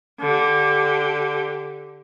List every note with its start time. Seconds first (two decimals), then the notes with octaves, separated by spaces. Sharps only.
0.20 D3 G4